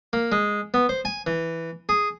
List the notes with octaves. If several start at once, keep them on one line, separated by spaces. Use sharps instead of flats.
A#3
G#3
B3
C5
G#5
E3
G#4